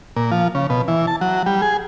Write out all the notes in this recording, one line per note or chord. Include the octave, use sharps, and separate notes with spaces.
A#2
F3
C#3
B2
E3
A5
F#3
G3
G#4